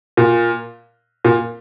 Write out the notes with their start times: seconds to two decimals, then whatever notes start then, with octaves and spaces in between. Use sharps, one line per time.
0.17 A#2
1.25 A#2